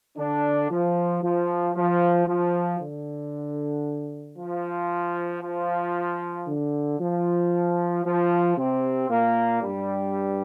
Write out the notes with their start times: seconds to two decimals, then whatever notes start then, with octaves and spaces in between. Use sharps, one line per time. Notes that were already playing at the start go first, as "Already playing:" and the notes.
0.17 D3 D4
0.71 F3
1.23 F3
1.75 F3
2.27 F3
2.80 D3
4.38 F3
5.42 F3
6.47 D3
7.00 F3
8.05 F3
8.57 C3 C4
9.09 A#2 A#3
9.62 G2 G3